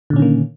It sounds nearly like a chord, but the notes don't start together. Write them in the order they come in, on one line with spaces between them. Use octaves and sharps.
D3 A#2 C#4 D#3 A#3